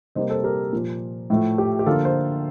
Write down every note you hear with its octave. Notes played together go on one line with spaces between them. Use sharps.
C3 G3 A#3 C5 D#5
A4 C5
G4 A#4
A#2 F3 A#3
A2 F3 A3
G4
G4
D3 F3 A#3 F4 A4
C5